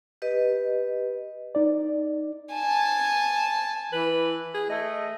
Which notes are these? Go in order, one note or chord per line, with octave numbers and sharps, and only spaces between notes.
G4 B4 D#5
D#4 D5
G#5 A5
E3 B4
G#4
A3 D#5